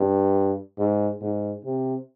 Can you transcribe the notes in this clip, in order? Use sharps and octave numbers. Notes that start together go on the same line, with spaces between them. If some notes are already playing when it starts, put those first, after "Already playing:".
Already playing: G2
G#2
G#2
C3